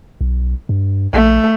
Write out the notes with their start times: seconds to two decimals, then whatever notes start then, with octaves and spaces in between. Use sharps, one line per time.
0.21 B1
0.69 G2
1.14 A#1 A3